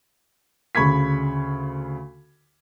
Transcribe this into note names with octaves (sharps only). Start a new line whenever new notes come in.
D2 C#3 B5 C#6 G#6 B6